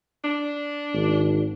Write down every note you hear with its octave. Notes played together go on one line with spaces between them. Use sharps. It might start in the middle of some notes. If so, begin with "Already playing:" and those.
D4
G#1